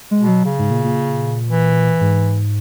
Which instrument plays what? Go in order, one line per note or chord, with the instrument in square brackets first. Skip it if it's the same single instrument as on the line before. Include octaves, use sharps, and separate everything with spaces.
[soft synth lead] G#3
[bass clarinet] B2
[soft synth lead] F#3
[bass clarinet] C#3
[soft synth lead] G#2
A#2
A#2
[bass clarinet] E3
[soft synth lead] G#2